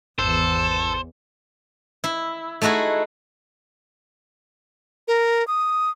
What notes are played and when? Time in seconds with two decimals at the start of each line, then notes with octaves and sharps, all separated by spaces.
0.19 G#1 E2 A4 C5
2.04 E4
2.62 A3 D#4 E4 F#4 G#4
5.08 A#4
5.47 D#6